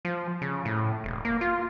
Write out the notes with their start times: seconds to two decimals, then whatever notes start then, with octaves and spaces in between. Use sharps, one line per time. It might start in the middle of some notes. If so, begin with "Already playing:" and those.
0.05 F3
0.42 C#3
0.65 A2
1.04 E1
1.25 A#3
1.41 F4